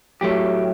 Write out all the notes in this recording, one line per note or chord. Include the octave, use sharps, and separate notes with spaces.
A2 F#3 A3 G4